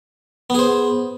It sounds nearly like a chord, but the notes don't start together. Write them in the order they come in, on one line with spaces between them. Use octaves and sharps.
B3 G#4 C5